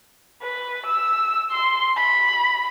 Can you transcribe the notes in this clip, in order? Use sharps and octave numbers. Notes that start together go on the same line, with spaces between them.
B4
E6
C6
B5